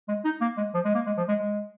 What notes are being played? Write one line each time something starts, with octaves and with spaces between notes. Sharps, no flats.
G#3
D#4
A#3
G#3
F3
G#3
A#3
G#3
F3
G#3
G#3